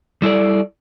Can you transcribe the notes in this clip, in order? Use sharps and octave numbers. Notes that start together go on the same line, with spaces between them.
G3 E4 A4 D5